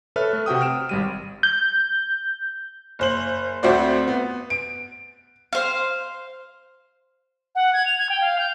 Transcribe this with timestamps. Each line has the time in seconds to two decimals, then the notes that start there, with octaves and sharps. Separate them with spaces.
0.16 A4 B4 C#5 E5 F6
0.33 A3
0.46 C3 F#4 G5 D#6
0.61 F6 D7 E7
0.89 G#1 G3 D#7
1.43 G6
2.99 F#1 C5 F#7
3.63 D2 C4 F#4 C5 D5
4.08 B3
4.50 D7
5.53 C5 F5
7.55 F#5
7.73 G#6
7.86 F7
7.98 G#6
8.10 G5
8.21 F5
8.39 G6